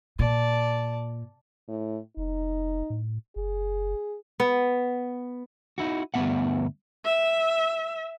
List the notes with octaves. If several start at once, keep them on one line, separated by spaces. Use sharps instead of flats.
A#2 D5 A5
A2
F1 D#4
A2
F#1 G#4
B3
D#4 E4 F#4
D2 G2 E3 B3 E5 F#5
E5